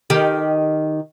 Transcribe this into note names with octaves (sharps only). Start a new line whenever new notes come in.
D#3 G4